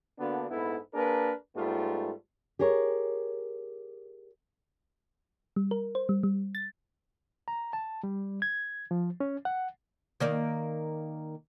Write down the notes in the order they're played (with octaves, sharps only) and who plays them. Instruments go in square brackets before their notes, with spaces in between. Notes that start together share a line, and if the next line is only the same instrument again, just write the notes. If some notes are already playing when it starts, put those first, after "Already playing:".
[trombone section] D3 A#3 B3 D4 F#4
A#1 G#2 B3 E4 A4
A#3 D4 G#4 A#4 B4
G#2 G3 A3 B3 F4
[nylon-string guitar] G4 G#4 A#4 C#5
[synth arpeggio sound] G3
A#4
C5
G3
G3
A6
[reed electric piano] A#5
A5
G3
G#6
F3
C#4
F#5
[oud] D#3 A#3 D5